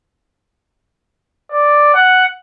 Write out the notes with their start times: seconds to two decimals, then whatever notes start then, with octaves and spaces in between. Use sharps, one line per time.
1.51 D5
1.94 F#5